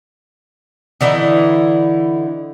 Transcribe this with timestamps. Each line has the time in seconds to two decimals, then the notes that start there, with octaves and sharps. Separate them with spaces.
1.01 D3 E3 D#4 E4